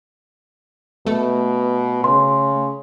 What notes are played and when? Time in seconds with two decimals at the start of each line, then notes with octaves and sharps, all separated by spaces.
1.07 B2 A3
2.04 C#3 C6